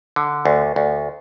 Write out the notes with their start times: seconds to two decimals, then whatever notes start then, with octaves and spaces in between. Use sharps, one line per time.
0.16 D3
0.45 D2
0.76 D2